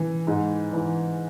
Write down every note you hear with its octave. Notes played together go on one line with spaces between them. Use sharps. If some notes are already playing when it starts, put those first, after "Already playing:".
Already playing: E3
G#2
E3